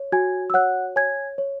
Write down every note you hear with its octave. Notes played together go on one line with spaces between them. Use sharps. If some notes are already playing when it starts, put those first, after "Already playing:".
Already playing: C#5
F#4 G#5 G#6
E6
C#5 F#5 F#6
C#5 G#5 G#6
C#5